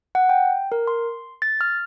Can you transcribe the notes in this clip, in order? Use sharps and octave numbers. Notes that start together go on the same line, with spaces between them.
F#5
G5
A#4
C6
A6
F6